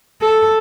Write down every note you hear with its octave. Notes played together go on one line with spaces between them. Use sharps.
A4